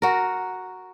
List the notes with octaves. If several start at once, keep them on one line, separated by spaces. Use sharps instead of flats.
F#4 A#4